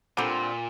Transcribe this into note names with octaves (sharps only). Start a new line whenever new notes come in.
A#2 D3 G3 C4